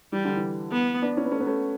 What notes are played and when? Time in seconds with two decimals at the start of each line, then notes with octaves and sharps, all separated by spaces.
0.12 E3 G3
0.25 D3
0.37 E3
0.72 B3
1.02 B3 D4
1.17 C#4 E4
1.25 B3
1.32 A3 C#4
1.40 B3
1.47 A3 C#4